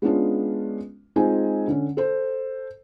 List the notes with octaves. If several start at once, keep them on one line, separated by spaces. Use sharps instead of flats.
G#3 B3 C#4 D4 F4
G#3 C4 D#4 F4 G#5
D3 C#4
A4 C5